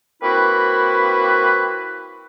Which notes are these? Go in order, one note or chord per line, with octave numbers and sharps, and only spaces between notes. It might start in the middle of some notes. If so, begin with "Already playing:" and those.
A#3 C4 E4 F#4 B4